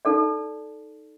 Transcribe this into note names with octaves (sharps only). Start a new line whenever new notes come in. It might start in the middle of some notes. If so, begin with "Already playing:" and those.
D#4 A4 D5